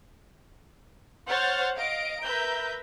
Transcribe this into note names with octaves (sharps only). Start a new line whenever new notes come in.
C5 C#5 F#5 F6 G6 A6
D#5 F5 D7
A#4 B4 E5 A#5 G6